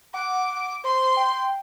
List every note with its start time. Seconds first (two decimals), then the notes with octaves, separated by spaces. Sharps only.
0.14 F#5 D6
0.84 C5 C6
1.17 G5